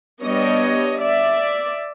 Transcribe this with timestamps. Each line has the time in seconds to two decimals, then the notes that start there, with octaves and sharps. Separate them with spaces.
0.22 G3 B3 D4 C#5 D#5
0.99 D5 E5